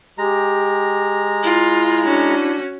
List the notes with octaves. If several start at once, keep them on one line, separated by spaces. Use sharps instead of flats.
G#3 G4 A#5
E4 F4
C#4 D4 F#4